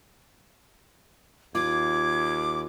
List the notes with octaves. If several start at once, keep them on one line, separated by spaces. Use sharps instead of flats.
D#2 F4 D6 G#6